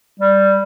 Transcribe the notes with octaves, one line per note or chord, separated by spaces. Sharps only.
G3